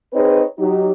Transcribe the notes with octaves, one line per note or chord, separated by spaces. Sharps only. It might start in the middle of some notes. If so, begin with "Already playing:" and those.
C4 D#4 G#4 B4 C#5 D#5
F#3 D#4 G4